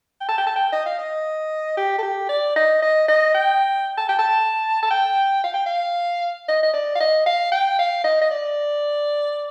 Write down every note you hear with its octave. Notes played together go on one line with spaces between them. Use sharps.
G5
A5
G5
A5
G5
D#5
F5
D#5
G4
A4
G4
D5
D#5
D#5
D#5
G5
A5
G5
A5
A5
G5
F5
G5
F5
D#5
D#5
D5
F5
D#5
F5
G5
F5
D#5
D#5
D5